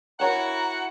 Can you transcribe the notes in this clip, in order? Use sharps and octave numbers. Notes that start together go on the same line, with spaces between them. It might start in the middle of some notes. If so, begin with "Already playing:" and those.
E4 F#4 A#4 C#5 F#5 G5 A#5